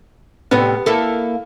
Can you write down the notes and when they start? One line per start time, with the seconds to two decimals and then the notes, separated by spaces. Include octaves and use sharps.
0.51 A2 C3 B3
0.86 A#3 E4 A4